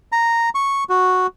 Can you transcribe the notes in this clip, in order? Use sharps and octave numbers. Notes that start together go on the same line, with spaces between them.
A#5
C#6
F#4